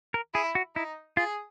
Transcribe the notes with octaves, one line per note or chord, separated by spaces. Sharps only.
A#4
E4 G#4
F#4
D#4 E4
F4 G#4